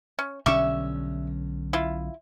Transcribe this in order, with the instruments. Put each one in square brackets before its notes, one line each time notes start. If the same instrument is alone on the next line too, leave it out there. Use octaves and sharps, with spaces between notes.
[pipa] C#4
[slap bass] B1 D3 C#4 [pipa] G3 E5 C#6
[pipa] E4 F4